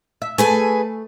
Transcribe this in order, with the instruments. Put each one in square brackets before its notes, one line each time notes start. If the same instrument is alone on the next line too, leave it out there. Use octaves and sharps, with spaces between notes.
[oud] E5
[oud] A3 [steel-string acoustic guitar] G#4 B4 G#5